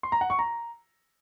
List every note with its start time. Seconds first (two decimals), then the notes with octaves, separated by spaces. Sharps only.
0.03 C6
0.12 A#5
0.21 F#5
0.30 C#6
0.39 A#5